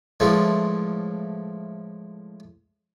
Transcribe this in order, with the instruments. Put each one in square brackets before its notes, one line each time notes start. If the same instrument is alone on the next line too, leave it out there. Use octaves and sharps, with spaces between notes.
[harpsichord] A2 E3 F3 G#3 C4